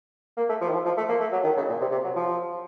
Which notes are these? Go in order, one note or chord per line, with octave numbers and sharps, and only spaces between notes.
A#3
A3
F3
D#3
F3
F3
A3
A#3
A3
F#3
D#3
C#3
A#2
C3
C3
F#3
F3